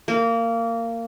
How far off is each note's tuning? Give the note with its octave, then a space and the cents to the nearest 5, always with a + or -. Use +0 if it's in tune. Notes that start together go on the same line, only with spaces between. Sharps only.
A#3 -20